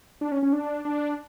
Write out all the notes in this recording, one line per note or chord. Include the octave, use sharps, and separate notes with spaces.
D4
C#4
C#4
D4
D4